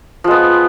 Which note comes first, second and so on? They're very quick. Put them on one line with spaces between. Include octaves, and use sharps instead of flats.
F3 G#3 B3